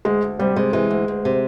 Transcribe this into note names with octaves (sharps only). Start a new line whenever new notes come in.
D2 G#3
D2
C3 G3
C3 G#3
E3 G#3
D2
D2
C3